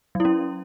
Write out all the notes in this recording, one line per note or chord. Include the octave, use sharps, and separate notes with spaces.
F#3 C#4 E4